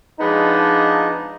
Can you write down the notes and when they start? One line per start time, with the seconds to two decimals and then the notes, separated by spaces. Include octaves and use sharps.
0.20 F3 G#3 B3 D4 D#4